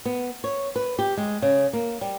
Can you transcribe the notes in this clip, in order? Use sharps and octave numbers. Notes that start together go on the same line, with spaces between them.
B3
C#5
B4
G4
G#3
C#3
A#3
G3